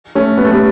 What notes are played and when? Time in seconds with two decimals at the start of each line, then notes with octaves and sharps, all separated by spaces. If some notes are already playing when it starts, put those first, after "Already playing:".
0.15 A3 C#4
0.38 B3
0.45 A3
0.51 G3 B3